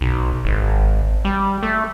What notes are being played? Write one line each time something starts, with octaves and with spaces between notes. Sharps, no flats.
B1
G#1
G3
A3